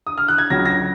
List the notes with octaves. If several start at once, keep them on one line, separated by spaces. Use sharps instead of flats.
D#6
F6
F#6
G#6
C#2 C#3 F#3 A#6
A#6